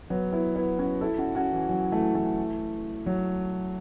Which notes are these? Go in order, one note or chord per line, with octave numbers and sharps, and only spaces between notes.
F#3 B3
B3 E4
B3 E4
C#4 F#4
E4 A4
C#4 F#4
C#4 F#4
E3
F#3
E3 A3
E3 A3
F#3